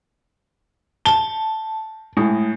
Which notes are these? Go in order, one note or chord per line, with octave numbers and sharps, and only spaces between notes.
A5 G7
A2 G#3